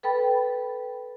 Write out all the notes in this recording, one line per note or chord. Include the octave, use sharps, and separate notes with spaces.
A4 B4 G5 B5 A6